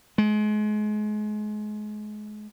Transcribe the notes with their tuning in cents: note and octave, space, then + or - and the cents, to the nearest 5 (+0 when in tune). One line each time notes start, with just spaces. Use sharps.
G#3 +30